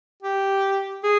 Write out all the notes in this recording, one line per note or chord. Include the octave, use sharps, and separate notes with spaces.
G4
G#4